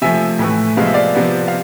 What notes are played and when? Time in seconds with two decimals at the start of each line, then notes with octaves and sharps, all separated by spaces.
0.02 C3 F3 A3 E5 G#5
0.39 A2 E3 A3
0.77 C3 F3 G#3 B3 F5
0.86 E5
0.94 D5 F5
1.15 C3 F3 B3
1.48 F5